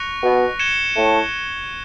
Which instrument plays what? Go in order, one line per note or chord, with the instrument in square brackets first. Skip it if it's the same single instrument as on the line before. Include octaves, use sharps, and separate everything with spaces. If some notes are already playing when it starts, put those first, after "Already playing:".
Already playing: [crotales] C#6 F#6 A#6 C#7 F7
[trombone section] B2 B3
[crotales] G#6 C#7 E7 G7
[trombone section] A2 A3